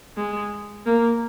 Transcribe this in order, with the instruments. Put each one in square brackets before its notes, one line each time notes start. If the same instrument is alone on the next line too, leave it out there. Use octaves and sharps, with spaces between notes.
[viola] G#3
A#3